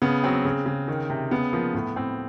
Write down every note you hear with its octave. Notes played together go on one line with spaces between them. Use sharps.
C#3 B3
F#3 C4
C#3
C#3
D#3
C3
C#3 B3
F3 A#3
A2 B3
A2 C4